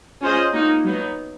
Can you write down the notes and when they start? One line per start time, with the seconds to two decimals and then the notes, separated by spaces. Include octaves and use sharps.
0.21 C#4 F4 G#4 C5 D#5
0.53 A#3 D#4 F#4
0.84 F#3 B3 D#4